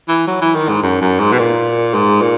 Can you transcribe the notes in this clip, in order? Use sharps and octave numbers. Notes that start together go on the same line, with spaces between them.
E3
F#3
E3
D#3
G#2
F#2
F#2
G#2
B2
A#2
G#2
A#2